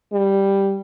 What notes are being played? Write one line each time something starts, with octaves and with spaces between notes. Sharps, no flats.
G3